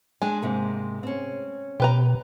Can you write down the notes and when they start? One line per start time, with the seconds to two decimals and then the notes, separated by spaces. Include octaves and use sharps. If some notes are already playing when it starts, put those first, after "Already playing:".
0.22 G#3 D4 G#5
0.42 G#2 C3 A#3
1.03 C4 C#4
1.80 B2 G4 B4 A#5